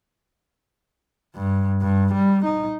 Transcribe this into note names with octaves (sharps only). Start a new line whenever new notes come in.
G2
G2
G3
D#4